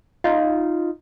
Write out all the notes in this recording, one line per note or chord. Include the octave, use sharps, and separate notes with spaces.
D#4 F4